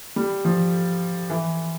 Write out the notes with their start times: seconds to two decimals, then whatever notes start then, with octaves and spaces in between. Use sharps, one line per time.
0.16 G3
0.45 F3
1.30 E3